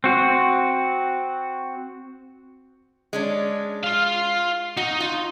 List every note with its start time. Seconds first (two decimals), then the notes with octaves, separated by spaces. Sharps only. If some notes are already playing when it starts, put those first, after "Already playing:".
0.04 C4 F#4
3.13 G#3 C#4 D4
3.84 F4 F5
4.77 D#4 F#4
5.00 F4